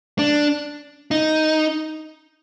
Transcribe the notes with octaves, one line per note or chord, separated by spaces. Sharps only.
D4
D#4